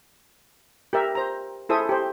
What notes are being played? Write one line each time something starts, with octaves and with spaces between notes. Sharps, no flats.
G4 A#4 E5
C5 A#5
E4 G#4 A4 C5 E5 D#6
G4 C5